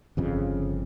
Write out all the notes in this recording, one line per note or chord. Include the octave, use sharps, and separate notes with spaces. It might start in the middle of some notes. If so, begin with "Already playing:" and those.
G1 F2 C#3